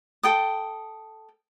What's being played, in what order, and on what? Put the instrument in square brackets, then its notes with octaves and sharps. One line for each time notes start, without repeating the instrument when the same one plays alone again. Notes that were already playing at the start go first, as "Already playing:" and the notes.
[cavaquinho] A4 G5 D#6